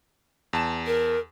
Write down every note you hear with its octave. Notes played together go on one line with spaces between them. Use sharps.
E2 A5 E7
A#4